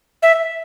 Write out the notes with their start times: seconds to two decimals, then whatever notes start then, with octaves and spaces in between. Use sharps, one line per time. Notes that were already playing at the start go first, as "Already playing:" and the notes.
0.23 E5